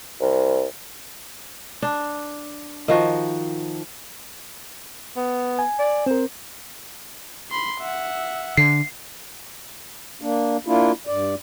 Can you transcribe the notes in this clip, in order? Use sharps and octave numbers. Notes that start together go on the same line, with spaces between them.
C2
D4
D#3 F3 F#4
B3
G#5
D5
C4 A#4 C5
B5 C6
E5 F#5
D3 C7
A#3 D4
A#3 D4 E4 F4
G2 D5